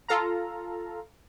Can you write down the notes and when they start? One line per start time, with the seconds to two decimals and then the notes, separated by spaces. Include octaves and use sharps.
0.08 F4 A4 F5 A#5